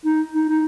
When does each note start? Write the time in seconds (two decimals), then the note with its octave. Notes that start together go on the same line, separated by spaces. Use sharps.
0.05 D#4
0.34 D#4
0.50 D#4